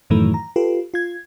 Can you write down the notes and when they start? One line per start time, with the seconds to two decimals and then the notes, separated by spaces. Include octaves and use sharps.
0.10 F#2 A2 D#3 E3 F#3 A3
0.34 A#5
0.56 F4 G4 A4 B4
0.94 F4 G#6